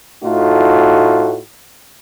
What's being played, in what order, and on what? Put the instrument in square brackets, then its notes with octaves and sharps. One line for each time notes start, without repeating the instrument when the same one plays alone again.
[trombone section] A2 A3 D#4 F4 F#4